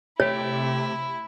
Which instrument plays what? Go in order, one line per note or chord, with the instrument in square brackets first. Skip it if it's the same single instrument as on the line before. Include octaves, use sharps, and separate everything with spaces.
[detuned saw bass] C3 [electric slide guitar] A3 G4 [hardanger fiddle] E4 [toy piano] C#5